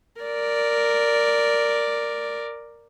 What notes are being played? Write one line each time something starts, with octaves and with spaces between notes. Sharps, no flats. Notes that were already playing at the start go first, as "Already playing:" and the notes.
A#4 D5